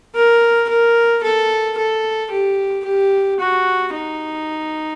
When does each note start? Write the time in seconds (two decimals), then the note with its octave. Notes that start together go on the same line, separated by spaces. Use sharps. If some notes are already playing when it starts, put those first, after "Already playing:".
0.15 A#4
0.69 A#4
1.23 A4
1.77 A4
2.31 G4
2.85 G4
3.40 F#4
3.94 D#4